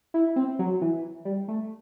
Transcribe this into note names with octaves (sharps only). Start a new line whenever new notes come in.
E4
C4
F#3
E3
G3
A3